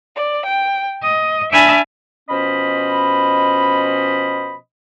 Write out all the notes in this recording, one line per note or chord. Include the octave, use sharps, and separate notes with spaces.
D5
G5
D#5
D4 E5 G#5 A5 B5 F6
B2 F3 C#4 C5 D#5 B5